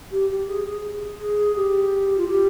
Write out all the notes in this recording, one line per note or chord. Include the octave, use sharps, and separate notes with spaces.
G4
G4
G#4
G#4
G#4
G4
F4
G4